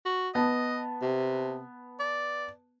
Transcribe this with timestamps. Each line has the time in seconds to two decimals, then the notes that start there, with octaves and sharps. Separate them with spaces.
0.06 F#4
0.35 B3 D#5 A5
1.02 C3
2.00 D5